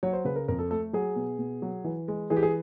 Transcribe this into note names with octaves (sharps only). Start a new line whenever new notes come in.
F#3 C#5
C5
C#3 B4
A#4
F2 A#4
A4
A3 A4
F#3 G#4
B2
B2
F#3
E3
G#3
E3 G#4
G4
G#4